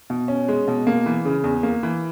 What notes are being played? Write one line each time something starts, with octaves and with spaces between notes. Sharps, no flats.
B2
C#4
G#3
B2
A#3
E3
C#3
E2
A#3
E3